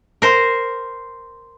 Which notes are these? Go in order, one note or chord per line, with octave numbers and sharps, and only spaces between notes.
A#4 C5